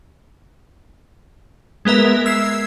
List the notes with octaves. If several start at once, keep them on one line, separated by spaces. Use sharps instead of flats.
G#3 B3 A#4 E5
E6 G#6 C7